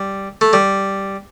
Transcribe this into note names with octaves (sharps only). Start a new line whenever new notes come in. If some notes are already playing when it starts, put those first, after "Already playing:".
Already playing: G3
A3
G3